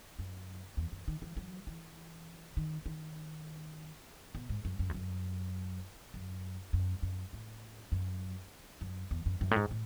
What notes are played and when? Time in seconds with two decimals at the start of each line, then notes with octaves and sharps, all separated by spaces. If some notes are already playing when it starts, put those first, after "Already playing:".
0.19 F#2
0.77 E2
0.92 F#2
1.08 D#3
1.22 E3
1.37 F#3
1.67 E3
2.57 D#3
2.86 D#3
4.35 B2
4.49 G#2
4.65 F#2
4.79 F#2
4.89 E2
4.94 F#2
6.14 F#2
6.73 F#2
7.02 F#2
7.33 A2
7.92 F#2
8.81 F#2
9.11 E2
9.26 F#2
9.41 F#2
9.51 A2
9.56 G#2
9.71 A2